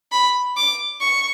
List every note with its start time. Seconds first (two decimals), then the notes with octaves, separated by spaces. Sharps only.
0.12 B5
0.57 D6
1.01 C#6